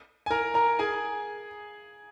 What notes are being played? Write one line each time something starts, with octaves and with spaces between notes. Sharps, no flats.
G#5
A#4 A#5
A#4 A#5
G#4 G#5